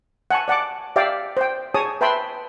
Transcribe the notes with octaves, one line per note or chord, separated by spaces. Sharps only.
F#5 G#5 A5 C#6
D5 F#5 A5 D6
G4 D5 E5 F5 G5 D6
C5 G5
G#4 C#5 G#5 A5 D#6
B4 E5 G5 A5 B5 C6